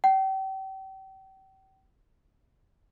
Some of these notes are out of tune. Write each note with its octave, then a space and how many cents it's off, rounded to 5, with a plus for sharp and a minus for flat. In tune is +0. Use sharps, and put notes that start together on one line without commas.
G5 -35